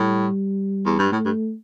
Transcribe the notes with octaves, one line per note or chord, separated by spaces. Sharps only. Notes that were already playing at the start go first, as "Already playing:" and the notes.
Already playing: A2 G3
E2
G2
A2 A3
G2